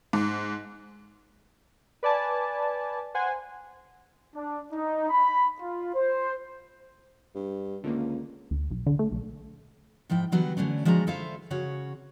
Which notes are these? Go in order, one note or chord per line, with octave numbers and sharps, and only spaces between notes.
G#2
B4 D5 G#5 A5
C5 F#5 G#5
D4
D#4
B5
F4
C5
G2
C#2 D3 D#3 A#3
D2
B1
D3
A3
B1
G#2 F3 E4 G5
D3 E3 F#3 G3 B3
D3 F#3 A3 C#4 D4
F3 G#3 D4 F#4 A5 A#5
E4 F4 A4 C5 E5 F5
C#3 C#4 F#4 C#5